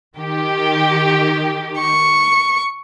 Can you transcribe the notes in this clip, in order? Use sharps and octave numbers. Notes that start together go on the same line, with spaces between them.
D#3 G4
C#6